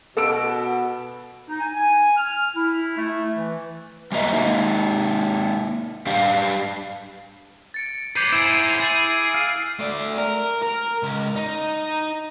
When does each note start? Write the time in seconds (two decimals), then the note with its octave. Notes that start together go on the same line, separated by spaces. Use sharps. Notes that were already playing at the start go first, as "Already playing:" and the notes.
0.17 B2 A4 E6 D7
1.48 D#4
1.60 G#5
1.75 G#5
2.17 F6
2.55 E4
2.97 A3
3.36 E3
4.12 G3 A#3 F#4 A#4 D#5 E5
4.33 G#3 A#3 D#4
6.06 G3 D4 G4 F5
7.74 A6 C#7 D7
8.16 B4 C#5 D6 G6 C7
8.32 E4 G#4 C5 D7
8.80 G#4 G6 A6
9.34 F5 E6 F6
9.79 A3 D5
10.18 A#4
10.62 A#4
11.03 C#2
11.36 D#4